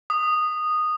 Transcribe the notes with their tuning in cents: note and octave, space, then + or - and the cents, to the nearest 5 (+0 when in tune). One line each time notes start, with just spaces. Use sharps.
D#6 -10